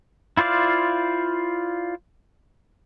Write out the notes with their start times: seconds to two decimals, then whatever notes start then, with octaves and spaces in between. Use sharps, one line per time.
0.37 E4 F4 C5 D5 F5